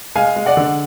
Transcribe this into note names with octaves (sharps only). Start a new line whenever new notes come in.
G#3 F5 G#5
G#3
D5 F#5
D3